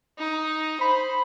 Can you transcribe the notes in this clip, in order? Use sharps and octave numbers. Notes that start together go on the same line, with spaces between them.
D#4
C5 B5